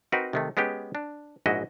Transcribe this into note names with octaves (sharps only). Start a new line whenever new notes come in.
C4 D#4 F#4 A#4 B4
C3 D#3 A3
G#3 B3 C#4 G4
D4
A#1 G#2 E4 F#4 D#5